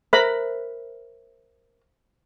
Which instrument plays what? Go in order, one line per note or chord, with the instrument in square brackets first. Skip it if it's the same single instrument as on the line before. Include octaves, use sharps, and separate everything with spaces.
[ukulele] A#4 [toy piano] C5 E5 E6 [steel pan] B5